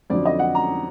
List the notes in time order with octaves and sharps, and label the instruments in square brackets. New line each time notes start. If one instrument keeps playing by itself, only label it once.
[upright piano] F2 D3 F#3 D5
D#5
F#5
A#5